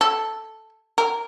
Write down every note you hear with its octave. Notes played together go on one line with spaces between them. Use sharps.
A4
A#4